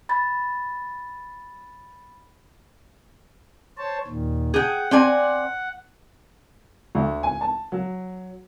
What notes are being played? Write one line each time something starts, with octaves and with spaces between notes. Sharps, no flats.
B5 A6
C5 C#5 A5
D#2 A#2 D#3
G#4 F#5 G5
C4 D5 G#5
D2
G#5
A5
F#3